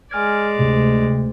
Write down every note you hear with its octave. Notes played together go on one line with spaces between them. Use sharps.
G#3 D5 G#5 F6 G#6
D2 C3